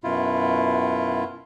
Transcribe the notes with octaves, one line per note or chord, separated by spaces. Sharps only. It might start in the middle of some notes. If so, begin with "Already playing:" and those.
F#2 B2 E4 F4